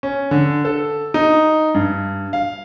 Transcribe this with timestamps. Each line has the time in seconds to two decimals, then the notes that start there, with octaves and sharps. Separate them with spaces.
0.03 C#4
0.31 D3
0.65 A4
1.14 D#4
1.75 G2
2.33 F5